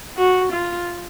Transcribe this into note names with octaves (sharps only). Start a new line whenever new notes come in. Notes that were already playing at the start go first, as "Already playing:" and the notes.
F#4
F4